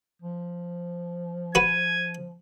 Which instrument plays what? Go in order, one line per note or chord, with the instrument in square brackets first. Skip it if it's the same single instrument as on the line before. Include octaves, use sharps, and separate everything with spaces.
[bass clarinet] F3
[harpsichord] F#4 B4 [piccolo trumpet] G#6 [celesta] D#7